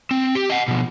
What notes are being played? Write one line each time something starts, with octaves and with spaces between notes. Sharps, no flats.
C4
G4
D#5 F#5
B2 F3